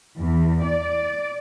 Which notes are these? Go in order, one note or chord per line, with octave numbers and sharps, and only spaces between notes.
E2
D5